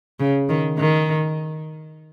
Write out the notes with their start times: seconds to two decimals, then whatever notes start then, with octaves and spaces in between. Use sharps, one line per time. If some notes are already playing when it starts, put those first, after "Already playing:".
0.20 C#3
0.49 D#3
0.78 D#3